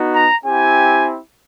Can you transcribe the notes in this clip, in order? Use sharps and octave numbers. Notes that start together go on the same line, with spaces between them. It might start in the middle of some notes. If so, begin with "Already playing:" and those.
Already playing: B3 D#4 F#4
A#5
C4 E4 G4 G#5